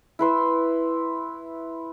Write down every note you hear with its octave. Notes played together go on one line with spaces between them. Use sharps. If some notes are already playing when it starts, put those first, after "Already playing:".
E4 B4 C6 E6